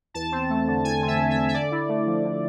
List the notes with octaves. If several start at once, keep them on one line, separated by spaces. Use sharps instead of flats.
E2 A5
C4
A3
D3
E2 G#5
C4
E5
A3
E5
D3
E5
D3 D5
E4
A3
F3
D3